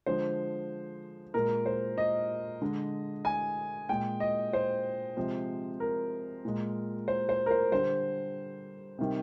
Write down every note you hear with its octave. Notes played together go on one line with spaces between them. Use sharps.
D3 F3 G#3 C5
A#2 G#3 A#4
C5
D#5
D3 G#3
G#5
A#2 G#3 G5
D#5
C5
C3 F3 G#3
A#4
A#2 G#3
C5
C5
A#4
C5
D3 G3 C5
C3 D#3 G3